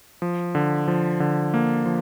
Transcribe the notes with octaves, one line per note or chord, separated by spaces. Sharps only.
F3
D3
F3
D3
A#3
F3